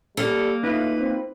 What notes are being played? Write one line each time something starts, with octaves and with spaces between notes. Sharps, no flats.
G3 A#3 A4
A2 D#4 F4 B4
C4